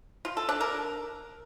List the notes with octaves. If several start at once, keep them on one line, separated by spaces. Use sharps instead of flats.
F4
A4
D4
A#4